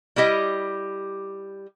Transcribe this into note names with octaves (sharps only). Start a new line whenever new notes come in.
G3 E4 G4 D#5